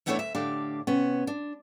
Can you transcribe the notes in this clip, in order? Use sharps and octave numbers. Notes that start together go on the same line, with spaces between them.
E3 A3 B3 D4 E4 C#5
D2 E5
A2 D3 D4 G4 F5
C3 B3 C#4
D4